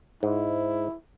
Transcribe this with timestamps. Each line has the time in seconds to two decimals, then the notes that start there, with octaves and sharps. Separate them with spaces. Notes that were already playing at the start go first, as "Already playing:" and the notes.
0.23 G#2 E4